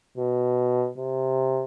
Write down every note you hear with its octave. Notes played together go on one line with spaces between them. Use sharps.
B2
C3